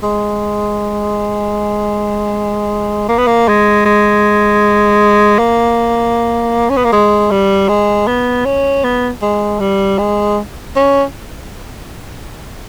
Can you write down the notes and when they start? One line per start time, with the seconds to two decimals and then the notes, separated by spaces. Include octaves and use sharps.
0.03 G#3
3.09 A#3
3.18 B3
3.27 A#3
3.48 G#3
3.85 G#3
5.39 A#3
6.70 C#4
6.77 B3
6.84 A#3
6.92 G#3
7.31 G3
7.69 G#3
8.07 B3
8.45 C#4
8.84 B3
9.22 G#3
9.60 G3
9.98 G#3
10.76 C#4